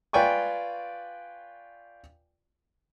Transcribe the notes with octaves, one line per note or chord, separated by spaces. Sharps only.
F4 B4 D5 G5 G#5 C#6